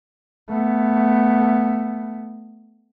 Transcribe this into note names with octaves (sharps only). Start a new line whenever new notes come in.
A3 B3